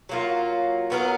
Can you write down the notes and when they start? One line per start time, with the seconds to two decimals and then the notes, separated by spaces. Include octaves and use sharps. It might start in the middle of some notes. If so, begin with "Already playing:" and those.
0.09 F#3 A#3 F4
0.90 F#3 B3 D#4 A#4